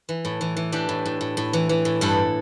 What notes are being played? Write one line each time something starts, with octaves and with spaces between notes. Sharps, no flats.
E3
A2
E3
E3
E3 D4 G4
A2
A2
A2
A2
E3
E3
A2
G2 E4 A4